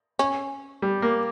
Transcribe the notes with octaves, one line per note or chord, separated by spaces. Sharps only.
C#4
G3
A#3